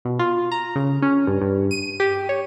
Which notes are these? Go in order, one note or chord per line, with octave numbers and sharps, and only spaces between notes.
B2
F4
A#5
C#3
C#4
G2
G2
D#7
G4
C#5